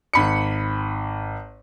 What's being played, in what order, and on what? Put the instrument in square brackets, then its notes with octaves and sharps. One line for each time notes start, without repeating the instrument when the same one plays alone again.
[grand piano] G#1 B5 C#7